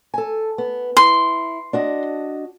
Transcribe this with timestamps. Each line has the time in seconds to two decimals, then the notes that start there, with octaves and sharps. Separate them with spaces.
0.14 A4 G#5
0.58 B3
0.97 E4 C6
1.73 D4 F#4 D#5